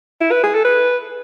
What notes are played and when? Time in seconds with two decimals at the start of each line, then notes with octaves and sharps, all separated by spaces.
0.21 E4
0.31 B4
0.43 G#4
0.55 A4
0.65 B4